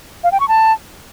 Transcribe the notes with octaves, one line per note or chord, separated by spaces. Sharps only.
F5
G5
C#6
A5